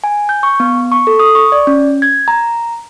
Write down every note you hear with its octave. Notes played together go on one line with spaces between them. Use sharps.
G#5
G6
C#6
B3
C#6
A4
D#6
C#6
D5
C#4
G#6
A#5